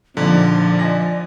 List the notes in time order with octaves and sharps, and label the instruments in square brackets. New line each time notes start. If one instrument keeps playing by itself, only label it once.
[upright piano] A#1 A#2 D#4 [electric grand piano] D3 [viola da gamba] F3 [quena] D5
[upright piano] D#5 G#5 A#6